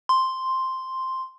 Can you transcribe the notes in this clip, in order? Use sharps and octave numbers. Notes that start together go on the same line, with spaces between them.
C6